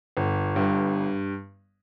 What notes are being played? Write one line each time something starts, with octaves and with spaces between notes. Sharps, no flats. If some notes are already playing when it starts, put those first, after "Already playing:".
G1
G2